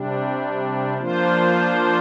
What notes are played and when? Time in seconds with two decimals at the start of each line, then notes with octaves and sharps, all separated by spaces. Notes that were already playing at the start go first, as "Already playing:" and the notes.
Already playing: C3 G3 D4
0.98 F3 A#3 D4 F4 C5